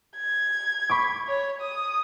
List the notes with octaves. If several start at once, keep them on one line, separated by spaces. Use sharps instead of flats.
G#6
B5 C#6 D6
C#5
D#6